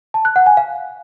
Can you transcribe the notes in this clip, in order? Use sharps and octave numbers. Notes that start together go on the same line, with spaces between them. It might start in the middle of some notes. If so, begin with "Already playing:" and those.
A5
F#6
F#5
G#5
F5